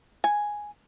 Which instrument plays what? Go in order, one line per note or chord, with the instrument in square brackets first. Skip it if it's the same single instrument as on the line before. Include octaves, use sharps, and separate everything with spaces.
[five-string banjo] G#5